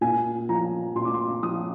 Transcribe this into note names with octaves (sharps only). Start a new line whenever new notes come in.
A#2 G#5
F3 A#5
A#2 C6
D6
C6
F3 D#6